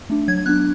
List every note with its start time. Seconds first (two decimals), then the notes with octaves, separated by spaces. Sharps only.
0.10 A3 D4
0.28 F#3 G#6
0.46 B3 D4 F#6